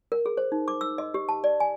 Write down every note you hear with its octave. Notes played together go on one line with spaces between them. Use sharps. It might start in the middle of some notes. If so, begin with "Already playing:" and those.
A#4
G#4
C5
D#4
D6
E6
D#5
G4
A5
D5
G#5